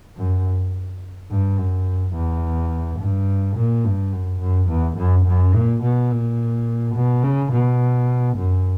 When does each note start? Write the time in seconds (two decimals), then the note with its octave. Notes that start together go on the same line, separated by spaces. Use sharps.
0.17 F#2
1.30 G2
1.58 F#2
2.14 E2
3.00 G2
3.56 A#2
3.84 G2
4.12 F#2
4.40 F#2
4.69 E2
4.97 F#2
5.26 F#2
5.54 A#2
5.83 B2
6.10 A#2
6.95 B2
7.23 C#3
7.52 B2
8.37 F#2